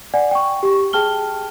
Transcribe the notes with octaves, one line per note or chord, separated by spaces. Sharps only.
D5 F#5 G#5
G5 C#6
G4 C#6
G#4 G5 A5 F6 G7